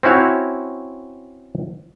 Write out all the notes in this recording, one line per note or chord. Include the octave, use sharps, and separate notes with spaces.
C4 C#4 E4 F#4 C#5